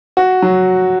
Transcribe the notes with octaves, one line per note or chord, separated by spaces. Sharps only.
F#4
F#3